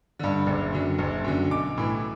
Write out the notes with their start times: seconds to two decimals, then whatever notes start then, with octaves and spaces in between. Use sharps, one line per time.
0.19 G2 D3
0.46 F#1
0.73 F#2 D3
0.98 F#1
1.24 F#2 D3
1.51 B1 D6
1.77 A2 E3